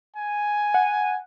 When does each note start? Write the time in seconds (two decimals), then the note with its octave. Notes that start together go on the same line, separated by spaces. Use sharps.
0.16 G#5
0.74 F#5